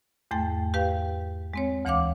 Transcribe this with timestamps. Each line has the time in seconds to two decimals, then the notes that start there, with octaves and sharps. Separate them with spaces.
0.31 E2 G#2 A3 G5 A6
0.74 G4 B4 F5 G5
1.54 G#3 C4 C#5
1.85 D2 E3 C#5 F5 F#5 D6